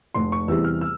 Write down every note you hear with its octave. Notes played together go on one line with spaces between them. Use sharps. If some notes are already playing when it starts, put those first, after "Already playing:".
F1 C6
C#6
E2 C3 E3 G3 E6
F6
E6